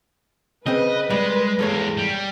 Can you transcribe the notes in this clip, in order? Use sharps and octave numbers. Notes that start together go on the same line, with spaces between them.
C#3 C4 B4 D#5
G3 G#3
E2 G#2 A#3 A4 C#5
G3